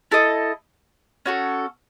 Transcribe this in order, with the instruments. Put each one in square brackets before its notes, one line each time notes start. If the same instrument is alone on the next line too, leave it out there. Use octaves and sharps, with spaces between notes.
[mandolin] E4 A4 D#5
C#4 F#4 A4